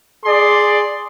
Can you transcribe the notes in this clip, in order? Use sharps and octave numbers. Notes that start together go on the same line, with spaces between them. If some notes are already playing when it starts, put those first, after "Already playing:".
G#4 D5 C6